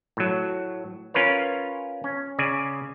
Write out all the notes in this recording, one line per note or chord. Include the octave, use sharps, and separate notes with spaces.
A2 F#3
C#4 F4 A#4 B4 C#5
C#4
C#3 D5 G#5